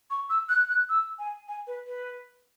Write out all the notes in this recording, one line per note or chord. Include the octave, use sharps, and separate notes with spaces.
C#6
E6
F#6
F#6
E6
G#5
G#5
B4
B4